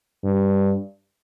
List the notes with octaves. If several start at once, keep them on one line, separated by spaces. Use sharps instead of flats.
G2